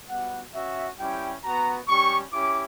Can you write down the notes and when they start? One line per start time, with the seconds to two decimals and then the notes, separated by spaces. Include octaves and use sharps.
0.09 G3 B3 F#4 F#5
0.55 C#4 F#4 E5
0.99 G3 C#4 E4 G4 G5
1.44 B3 F#4 A#5
1.88 G3 C#4 G4 C#6
2.33 C#4 E4 G4 D6